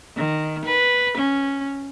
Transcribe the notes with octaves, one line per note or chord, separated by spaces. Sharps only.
D#3
B4
C#4